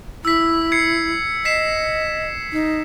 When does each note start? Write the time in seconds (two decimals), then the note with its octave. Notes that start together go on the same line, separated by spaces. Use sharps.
0.25 E4 E6 B6
0.72 G#6 C7 C#7
1.45 D#5 B6 C7 E7
2.52 D#4